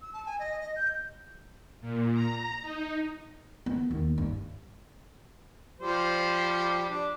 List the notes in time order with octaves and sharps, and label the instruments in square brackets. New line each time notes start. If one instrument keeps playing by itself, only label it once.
[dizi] E6
A5
G#5
D#5
D#5
G6
[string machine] A#2
A#5
D#4
[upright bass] B3
D#2
G2
[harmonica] F3 G3 C5
D4